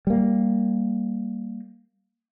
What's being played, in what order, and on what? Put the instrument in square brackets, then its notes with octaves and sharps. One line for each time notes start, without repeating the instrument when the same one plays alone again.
[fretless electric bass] G3 A#3